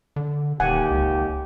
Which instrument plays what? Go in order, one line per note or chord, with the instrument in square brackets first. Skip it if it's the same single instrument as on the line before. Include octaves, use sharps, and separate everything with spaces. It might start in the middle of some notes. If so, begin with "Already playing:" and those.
[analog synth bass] D3
[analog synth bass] D#1 [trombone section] D#2 G4 [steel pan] F#5 G#5
[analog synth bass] C#2